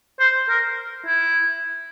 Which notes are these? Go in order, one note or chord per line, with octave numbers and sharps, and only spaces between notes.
C5
A#4
E4